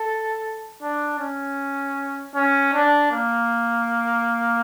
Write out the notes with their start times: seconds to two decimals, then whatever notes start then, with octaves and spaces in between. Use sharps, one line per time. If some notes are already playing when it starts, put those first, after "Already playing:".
Already playing: A4
0.82 D4
1.19 C#4
2.35 C#4
2.74 D4
3.12 A#3